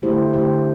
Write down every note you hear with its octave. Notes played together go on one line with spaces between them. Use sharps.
D3 A3 E4 G4 C5
D3 A3 E4 G4 C5